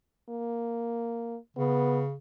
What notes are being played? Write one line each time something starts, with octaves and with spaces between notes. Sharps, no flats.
A#3
C#3 B3